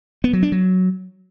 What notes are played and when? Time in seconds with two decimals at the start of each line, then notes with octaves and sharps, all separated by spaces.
0.24 B3
0.33 F#3
0.43 D4
0.52 F#3